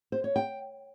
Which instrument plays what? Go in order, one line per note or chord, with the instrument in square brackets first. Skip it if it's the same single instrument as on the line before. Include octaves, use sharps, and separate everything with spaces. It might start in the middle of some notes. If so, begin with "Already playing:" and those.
[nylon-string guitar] C5
C#5
G5